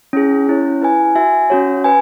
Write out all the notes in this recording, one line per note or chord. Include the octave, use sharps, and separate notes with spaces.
C#4 E4 G#4
C#4 E4 C#5
E4 B4 G#5
F#4 E5 G#5
C#4 F#4 C#5
B4 G#5